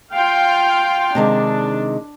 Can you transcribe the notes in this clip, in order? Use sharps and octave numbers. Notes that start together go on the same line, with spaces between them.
F4 F5 G5
C3 D#3 G#3 D4